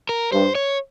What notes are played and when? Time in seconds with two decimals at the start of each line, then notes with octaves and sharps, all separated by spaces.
0.09 A#4
0.32 G2 C5
0.55 C#5